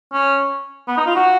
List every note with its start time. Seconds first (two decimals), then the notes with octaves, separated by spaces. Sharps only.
0.13 C#4
0.88 B3
0.97 D#4
1.07 F4
1.16 F#4